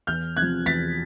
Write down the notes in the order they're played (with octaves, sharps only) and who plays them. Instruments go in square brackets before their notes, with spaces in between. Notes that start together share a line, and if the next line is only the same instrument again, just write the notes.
[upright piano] E2 F6 G6
C3 F#6 G#6
F3
E2 A6 B6